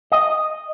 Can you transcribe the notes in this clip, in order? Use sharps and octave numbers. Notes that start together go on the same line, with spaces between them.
D#5